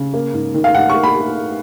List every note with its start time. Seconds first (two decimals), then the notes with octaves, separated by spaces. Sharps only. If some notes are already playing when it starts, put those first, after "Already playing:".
Already playing: C#3
0.14 A#3
0.33 G#2
0.54 D#3
0.64 F5
0.74 G#2 F#5
0.90 A#3 C#6
1.04 B5